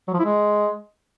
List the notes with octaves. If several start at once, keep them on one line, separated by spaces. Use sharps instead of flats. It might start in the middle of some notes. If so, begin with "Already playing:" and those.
F#3
F3
E4
G#3